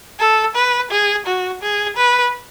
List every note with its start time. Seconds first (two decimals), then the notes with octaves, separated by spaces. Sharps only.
0.20 A4
0.55 B4
0.91 G#4
1.26 F#4
1.62 G#4
1.97 B4